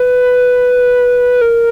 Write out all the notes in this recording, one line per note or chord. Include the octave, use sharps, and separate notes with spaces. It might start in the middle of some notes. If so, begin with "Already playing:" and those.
Already playing: B4
A#4